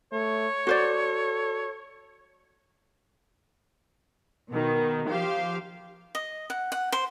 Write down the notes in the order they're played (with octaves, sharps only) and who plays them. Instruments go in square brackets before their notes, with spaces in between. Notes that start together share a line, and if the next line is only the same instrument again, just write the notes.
[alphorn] A3 [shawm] C#5
[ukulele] F#4 C5 D5 [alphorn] A4
[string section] B2 D#3
F3 G4 C5 F5
[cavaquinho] D#5
F#5
F#5
C5